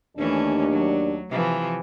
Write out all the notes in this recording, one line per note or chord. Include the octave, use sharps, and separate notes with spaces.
D#2 E3 A3 C#4 D4
F#3
C3 E3 F3